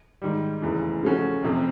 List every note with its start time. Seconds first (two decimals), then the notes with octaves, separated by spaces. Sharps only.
0.22 G#2 D#3 G3
0.62 F1 E2 C#3 E3
1.03 C#3 F3 A3 C#4 F#4
1.43 F1 F2 C3